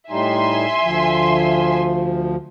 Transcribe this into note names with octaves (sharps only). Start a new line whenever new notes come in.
A2 G3 D#4 E5 G#5 C6
D2 F3